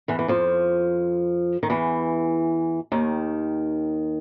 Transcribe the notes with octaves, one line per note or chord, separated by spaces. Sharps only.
E2 E3
E3
F2 F3
D#3
E2 E3
D#2 D#3